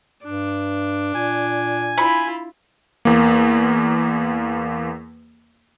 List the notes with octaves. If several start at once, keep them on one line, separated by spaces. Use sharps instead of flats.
G2 D4
A#2 G#5
E4 F4 B5
E2 A#3